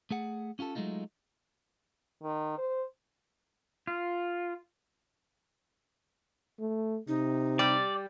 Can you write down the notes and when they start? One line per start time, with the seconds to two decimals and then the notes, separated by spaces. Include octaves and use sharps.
0.11 A3 G#4 F#5
0.59 C#4 F4 G4 A4
0.75 F#3 G#3 A3 D#4 F4
2.23 D#3
2.58 C5
3.87 F4
6.60 A3
7.08 C3 D#4
7.59 G3 D5